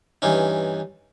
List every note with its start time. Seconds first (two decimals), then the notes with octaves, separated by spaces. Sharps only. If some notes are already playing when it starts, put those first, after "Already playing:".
0.22 G2 E3 C#4 D#4